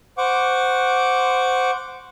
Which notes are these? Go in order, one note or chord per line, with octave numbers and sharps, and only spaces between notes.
C5 F#5 C#6 D6